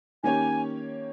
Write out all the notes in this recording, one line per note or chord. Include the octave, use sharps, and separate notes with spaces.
D#3 A#3 C#4 G4 C#5 G#5